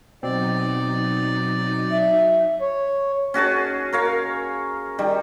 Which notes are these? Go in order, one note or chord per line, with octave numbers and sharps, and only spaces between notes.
B2 F#3 C4 D#4 D5
E5
C#5
C#4 F#4 G#4 A5
A#4 C#5 F5
D#3 G3